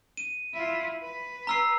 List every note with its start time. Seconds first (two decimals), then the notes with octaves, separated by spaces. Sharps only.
0.17 D#7
0.53 E4 F4
1.02 B4
1.47 A#5 E6 C7